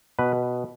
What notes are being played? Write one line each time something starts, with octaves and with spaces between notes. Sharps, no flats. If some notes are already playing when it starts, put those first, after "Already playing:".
B2 B4